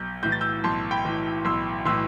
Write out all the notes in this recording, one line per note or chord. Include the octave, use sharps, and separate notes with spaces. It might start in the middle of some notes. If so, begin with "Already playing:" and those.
Already playing: B1 G6
A2 E3 G6
A6
E6 G6
B1 A5 C6
G5 B5
A2 E3
B1 C6 E6
A2 E3 C6 E6